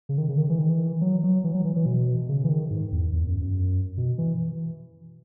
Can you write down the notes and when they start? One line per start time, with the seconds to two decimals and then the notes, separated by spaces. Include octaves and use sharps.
0.09 C#3
0.18 D#3
0.28 C#3
0.38 D#3
0.50 E3
0.59 D#3
0.69 E3
1.01 F#3
1.23 F#3
1.44 E3
1.54 F#3
1.65 E3
1.76 E3
1.86 B2
2.29 C#3
2.44 E3
2.49 D#3
2.71 G#2
2.92 E2
3.13 E2
3.27 F#2
3.41 F#2
3.97 B2
4.18 E3